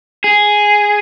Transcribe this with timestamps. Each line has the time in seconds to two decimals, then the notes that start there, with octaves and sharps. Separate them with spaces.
0.24 G#4